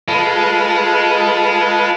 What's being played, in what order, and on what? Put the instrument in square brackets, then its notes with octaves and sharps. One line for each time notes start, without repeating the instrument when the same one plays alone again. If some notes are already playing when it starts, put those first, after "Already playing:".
[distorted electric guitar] G#3 [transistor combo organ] F4 A4 B4